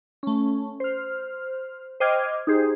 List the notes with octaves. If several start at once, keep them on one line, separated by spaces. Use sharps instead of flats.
A3 C#4
C5 F6
C5 D#5 G5 D6 F6 G#6
D#4 G4 G#4 C5